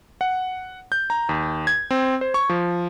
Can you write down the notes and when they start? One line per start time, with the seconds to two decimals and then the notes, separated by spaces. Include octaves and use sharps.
0.21 F#5
0.92 G6
1.10 A#5
1.29 D#2
1.67 G#6
1.91 C4
2.21 C5
2.34 C#6
2.49 F3